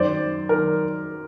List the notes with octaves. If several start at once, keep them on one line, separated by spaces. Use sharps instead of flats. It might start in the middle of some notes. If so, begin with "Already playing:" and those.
Already playing: F#2 D#3 C5 D5
D#3 A#4